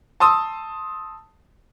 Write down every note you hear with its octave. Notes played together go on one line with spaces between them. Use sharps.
A5 C6 D#6 E6